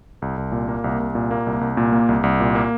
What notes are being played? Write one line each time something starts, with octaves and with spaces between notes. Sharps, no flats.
C2
C2
A#2
A#3
C2
C2
A#2
A#3
C2
C2
A#2
A#3
C2
C2
A#2
A#3